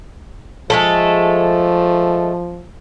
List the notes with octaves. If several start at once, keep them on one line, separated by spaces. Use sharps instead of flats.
F3 G#3 A3 A4